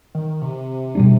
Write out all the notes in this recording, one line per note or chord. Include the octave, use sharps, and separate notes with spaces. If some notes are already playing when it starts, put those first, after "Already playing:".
D#3
C3
B2 G3 D4